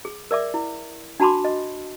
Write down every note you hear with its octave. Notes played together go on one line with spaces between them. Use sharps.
G#4
A#4 D5 E5 D6
E4
D4 F#4 A5 B5 C6 D6
D#5